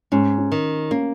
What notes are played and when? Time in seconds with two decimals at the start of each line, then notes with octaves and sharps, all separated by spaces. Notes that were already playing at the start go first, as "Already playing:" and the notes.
0.12 G#2 C#4
0.38 C#4
0.52 D#3
0.91 A#3 C#4